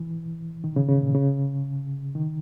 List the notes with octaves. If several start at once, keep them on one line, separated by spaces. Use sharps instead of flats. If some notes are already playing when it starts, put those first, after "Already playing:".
Already playing: E3
D#3
C#3
C#3
A#2
C#3
D#3